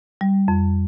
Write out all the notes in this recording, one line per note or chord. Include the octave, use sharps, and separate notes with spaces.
G3
F2